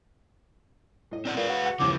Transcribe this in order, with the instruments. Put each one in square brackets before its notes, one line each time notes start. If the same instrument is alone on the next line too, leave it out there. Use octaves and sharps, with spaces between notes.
[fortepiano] A2 D#5
[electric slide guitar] C4 D5 F#5
[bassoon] A#2 [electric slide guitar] G#4 B4 F5
[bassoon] F#4
[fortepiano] F#5
[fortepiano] D#2 E3 [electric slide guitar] C#3 F3 [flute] D6